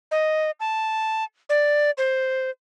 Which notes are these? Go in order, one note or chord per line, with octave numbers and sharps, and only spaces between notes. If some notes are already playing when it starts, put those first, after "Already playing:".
D#5
A5
D5
C5